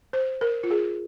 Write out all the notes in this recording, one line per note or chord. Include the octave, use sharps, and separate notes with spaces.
C5
A#4
F4
G#4